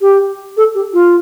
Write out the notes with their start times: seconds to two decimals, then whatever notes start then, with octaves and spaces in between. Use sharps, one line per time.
0.01 G4
0.57 A4
0.75 G4
0.93 F4